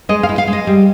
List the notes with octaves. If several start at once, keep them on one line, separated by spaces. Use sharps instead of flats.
G#3 D#5
F5
E4
F5
G#3
D#5
G3